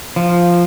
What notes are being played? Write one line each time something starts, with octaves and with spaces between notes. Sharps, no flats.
F3